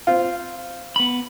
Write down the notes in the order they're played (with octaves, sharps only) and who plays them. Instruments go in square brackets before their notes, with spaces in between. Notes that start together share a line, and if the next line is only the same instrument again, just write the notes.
[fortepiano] C4 F4
[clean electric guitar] B3 B5